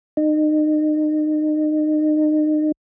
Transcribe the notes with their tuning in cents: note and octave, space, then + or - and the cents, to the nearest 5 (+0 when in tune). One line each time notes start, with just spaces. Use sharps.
D#4 -30